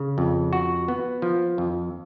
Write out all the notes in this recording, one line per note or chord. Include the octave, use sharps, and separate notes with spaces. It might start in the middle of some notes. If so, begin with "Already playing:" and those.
Already playing: C#3
F2
F#4
B3
F3
F2